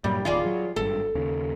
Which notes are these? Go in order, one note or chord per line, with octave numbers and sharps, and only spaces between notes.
G2 A#2 F#3 G3
D1 D#3 F4 G#4 D5
F#3
G#1 G2 A4
D#2 C#3